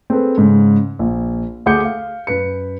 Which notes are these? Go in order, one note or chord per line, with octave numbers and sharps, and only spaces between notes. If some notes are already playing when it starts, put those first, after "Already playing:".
C4 G#4 A4 B4
G#2 C#3
A#1
D2 G#4 F#5 D6 G6 C#7
F5
F#2 B4 C#7